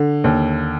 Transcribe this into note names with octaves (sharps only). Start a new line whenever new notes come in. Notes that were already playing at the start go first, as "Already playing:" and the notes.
Already playing: D3
D#2